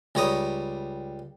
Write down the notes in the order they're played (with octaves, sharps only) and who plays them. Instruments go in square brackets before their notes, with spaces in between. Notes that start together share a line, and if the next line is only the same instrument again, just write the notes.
[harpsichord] C#2 G3 C#5 A#5 D#6